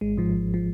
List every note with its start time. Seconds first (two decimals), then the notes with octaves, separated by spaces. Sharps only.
0.01 G#1 G#3
0.17 G#2 F3
0.34 G#1
0.54 F3